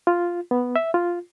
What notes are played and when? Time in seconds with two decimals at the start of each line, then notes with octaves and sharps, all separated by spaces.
0.07 F4
0.51 B3
0.76 E5
0.94 F4